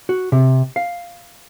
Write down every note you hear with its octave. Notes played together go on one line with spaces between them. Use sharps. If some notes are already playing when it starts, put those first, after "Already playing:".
F#4
C3
F5